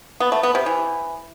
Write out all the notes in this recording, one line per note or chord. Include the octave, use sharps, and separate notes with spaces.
B3
A3
B3
C3
E3